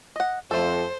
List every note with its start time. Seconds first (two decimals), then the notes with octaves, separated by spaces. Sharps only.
0.16 D#5 F#5
0.51 F2 A3 A4 C5